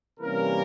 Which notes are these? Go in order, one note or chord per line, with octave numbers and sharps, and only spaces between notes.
C3 E3 G3 A#3 C#4 A#4